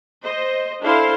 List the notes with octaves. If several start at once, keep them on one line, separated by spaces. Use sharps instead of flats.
C5 D#5
D4 E4 A4 C5 F5 C6